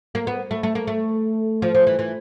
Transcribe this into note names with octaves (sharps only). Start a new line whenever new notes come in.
A#3
B3
A3
A3
A#3
A3
F3
F3
E3
E3